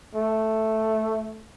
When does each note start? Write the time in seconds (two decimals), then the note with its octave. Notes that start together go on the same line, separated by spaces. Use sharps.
0.15 A3